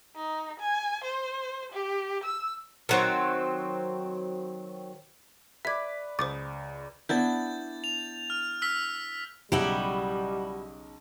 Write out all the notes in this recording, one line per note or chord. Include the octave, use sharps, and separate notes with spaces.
D#4
G#5
C5
G4
E6
D#3 F#3 C4
B4 D5 E5 G#6 B6
C#2 C5 D6 D#6 A6
B3 D4 E4 G6 A6
F7
F6
E6 F6 B6
B1 C#3 G3 D#4 E4 F#4 G4